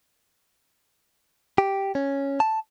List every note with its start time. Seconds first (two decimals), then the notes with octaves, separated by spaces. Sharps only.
1.58 G4
1.95 C#4
2.40 A5